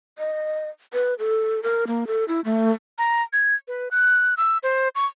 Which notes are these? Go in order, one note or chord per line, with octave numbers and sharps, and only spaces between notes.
D#5
B4
A4
A#4
A#3
A4
E4
A3
A#5
G#6
B4
F#6
E6
C5
C#6